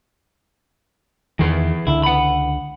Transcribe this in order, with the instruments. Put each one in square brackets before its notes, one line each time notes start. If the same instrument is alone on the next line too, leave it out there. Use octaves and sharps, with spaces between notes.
[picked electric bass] E2 D#3 [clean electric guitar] E3 G#4
[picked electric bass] C#2 D3 [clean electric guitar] E4
[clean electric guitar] F#5 B5